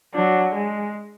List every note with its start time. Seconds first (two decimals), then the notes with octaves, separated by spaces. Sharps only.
0.14 F#3 D4
0.55 G#3